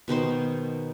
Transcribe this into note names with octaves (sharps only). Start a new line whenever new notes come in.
B2 D#3 D#4 C5